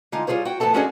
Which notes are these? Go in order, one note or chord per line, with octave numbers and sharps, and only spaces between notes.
D3 G#3 D#4 F4
G3 F4 G#4 C5 C#5
F#4 F#5 G5
E2 A2 A#3 B3 A4 A5
G#3 C#4 D4 F#4 G#4 A4